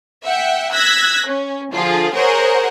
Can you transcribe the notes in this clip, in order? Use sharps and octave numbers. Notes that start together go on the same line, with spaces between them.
E5 F#5 G5
E6 F#6 G#6 A#6 B6
C#4
D3 F3 F4 G#4
G#4 A#4 C5 C#5 F#5